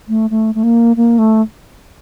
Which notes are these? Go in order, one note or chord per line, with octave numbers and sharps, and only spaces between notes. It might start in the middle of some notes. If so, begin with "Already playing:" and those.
A3
A3
A3
A#3
A#3
A3